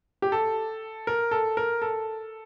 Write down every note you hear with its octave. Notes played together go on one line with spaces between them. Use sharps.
G4
A4
A#4
A4
A#4
A4